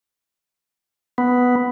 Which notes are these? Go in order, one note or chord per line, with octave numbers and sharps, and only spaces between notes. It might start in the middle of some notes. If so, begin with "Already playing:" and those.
B3